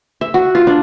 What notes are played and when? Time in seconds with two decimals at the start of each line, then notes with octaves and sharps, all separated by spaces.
0.21 E5
0.34 F#4
0.55 F4
0.67 D4